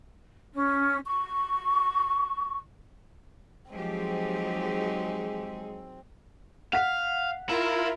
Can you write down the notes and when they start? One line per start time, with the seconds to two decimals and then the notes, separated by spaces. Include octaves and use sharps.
0.53 C#4
1.05 C#6
3.72 F3 F#3 G#3 C4 D#4 G4 G#4
6.73 F5 F#5 B6
7.49 E4 F4 A#4